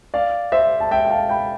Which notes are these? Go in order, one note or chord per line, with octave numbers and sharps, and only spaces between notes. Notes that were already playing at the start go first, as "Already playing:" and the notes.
D5 F5
C5 E5
A5
E5 G5
G5
F5 A5
G5 B5